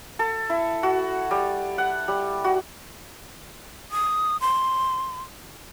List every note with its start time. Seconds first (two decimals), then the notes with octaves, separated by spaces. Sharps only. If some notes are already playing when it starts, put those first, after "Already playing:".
0.19 A4
0.50 E4
0.83 F#4
1.31 G3
1.78 F#5
2.08 G3
2.44 F#4
3.91 D#6
4.41 C6